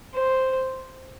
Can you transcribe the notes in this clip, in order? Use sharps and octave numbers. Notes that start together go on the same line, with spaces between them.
C5